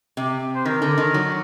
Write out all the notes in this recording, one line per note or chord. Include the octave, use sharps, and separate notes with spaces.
C3
C5
D#3 A#4
D3
D#3
F#3